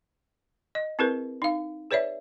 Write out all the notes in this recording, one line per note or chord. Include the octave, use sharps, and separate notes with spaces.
D#5
C4 E4 G#4 A#4 B4
D#4 F5
G#4 B4 C#5 D5 E5